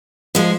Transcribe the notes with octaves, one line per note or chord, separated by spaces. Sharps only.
F3 G#3